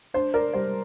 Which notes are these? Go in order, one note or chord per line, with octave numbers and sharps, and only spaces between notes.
D4 C5
A#4 D5
G3 C5